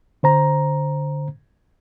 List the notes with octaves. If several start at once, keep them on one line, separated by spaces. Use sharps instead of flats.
D3 C5 A#5